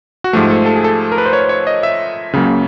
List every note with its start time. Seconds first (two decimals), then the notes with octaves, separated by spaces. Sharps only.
0.24 F#4
0.33 G#2 F3 A3 G4
0.50 A4
0.66 A4
0.76 G#4
0.84 A4
1.12 A#4
1.18 B4
1.26 C5
1.33 C#5
1.49 C#5
1.67 D#5
1.83 E5
2.33 C#2 C#3 F#3 A#3